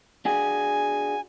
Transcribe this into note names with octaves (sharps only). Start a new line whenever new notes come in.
D4 F#4 G#4 G#5